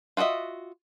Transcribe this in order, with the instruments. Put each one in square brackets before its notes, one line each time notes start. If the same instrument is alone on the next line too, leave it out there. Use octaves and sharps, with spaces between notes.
[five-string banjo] F4 F#4 A4 D#5 E5